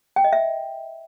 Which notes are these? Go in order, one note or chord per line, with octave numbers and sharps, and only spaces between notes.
G5
D#5
E5